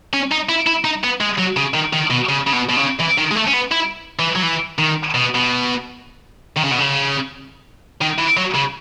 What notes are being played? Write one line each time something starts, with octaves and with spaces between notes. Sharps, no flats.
C#4
D#4
E4
E4
D#4
B3
G#3
F#3
C#3
D#3
D#3
B2
C#3
C#3
B2
B2
C#3
E3
D#3
G#3
A3
C#4
B3
E4
E3
F#3
E3
D#3
B2
B2
D#3
C#3
B2
C#3
D#3
E3
F#3
C#3